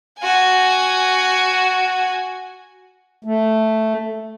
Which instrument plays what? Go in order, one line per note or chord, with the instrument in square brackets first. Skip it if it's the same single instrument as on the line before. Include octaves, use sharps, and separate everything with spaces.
[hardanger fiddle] F#4 G#5
[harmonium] A3